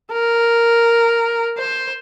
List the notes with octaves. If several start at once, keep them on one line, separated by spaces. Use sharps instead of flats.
A#4
C5